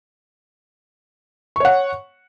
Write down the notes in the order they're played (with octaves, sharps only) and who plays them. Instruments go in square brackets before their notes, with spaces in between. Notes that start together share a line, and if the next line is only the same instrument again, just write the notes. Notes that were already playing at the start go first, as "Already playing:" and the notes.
[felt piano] C#6
C#5
F#5